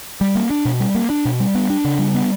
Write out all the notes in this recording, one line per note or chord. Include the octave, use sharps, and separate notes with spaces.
G3
A#3
D4
B2
G3
A#3
D4
B2
G3
B3
D4
C#3
G3
B3